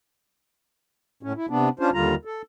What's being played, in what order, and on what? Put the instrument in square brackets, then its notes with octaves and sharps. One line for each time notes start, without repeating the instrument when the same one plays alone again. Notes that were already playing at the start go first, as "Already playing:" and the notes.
[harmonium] A2 C#4
E4
C3 B3 D4
C#4 D4 F4 C5
D#2 D3 G3 F4 A#5
A4